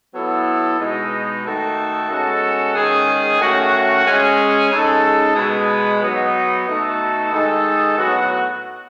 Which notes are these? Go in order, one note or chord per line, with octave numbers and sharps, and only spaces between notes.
F#3 B3 E4 A4
B2 G#3 D#4
D#3 A3 D#4 F#4 A4
B2 G#3 C#4 F#4 A4
D#3 G#3 C#4 G#4
D#3 A3 C#4 F#4
G#3 C#4 G#4
C#3 G#3 D#4 A4
B2 G#3 B3
F#3 B3 D#4
B2 A3 D#4 F#4 A4
D#3 G#3 D#4 A4
A2 F#3 B3 F#4